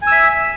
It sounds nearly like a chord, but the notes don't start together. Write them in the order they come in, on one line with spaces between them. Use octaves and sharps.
G#5 E6 E5